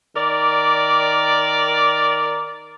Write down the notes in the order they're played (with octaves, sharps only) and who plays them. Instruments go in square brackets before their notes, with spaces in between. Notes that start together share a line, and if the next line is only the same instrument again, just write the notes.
[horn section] D#3 A#4 D5